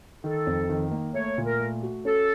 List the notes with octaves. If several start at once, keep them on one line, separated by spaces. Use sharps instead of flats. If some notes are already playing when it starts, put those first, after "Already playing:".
D#3 A4
F2
D#3
A#3
A3 C#5
A#2
A#4
A3
F#4
C#4 A4